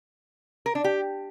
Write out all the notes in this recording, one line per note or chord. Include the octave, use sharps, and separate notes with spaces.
A#4
D4
G4